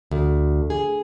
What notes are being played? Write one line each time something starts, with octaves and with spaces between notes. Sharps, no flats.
D2
G#4